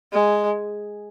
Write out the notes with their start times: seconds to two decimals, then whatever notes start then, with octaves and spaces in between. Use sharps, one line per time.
0.13 G#3